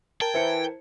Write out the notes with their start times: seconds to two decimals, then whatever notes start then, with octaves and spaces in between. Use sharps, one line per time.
0.21 A#4 G5 A5 G#6
0.34 E3 E4 C5 C#7